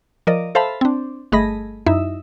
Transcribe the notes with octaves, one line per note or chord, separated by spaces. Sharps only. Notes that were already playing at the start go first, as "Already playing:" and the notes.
F3 A#4 D5 D#5
A4 C5 E5 F5 A5 B5
C4 D4
G1 A3 G#4 D#5 B5 A#6
F#2 D#4 E4 E5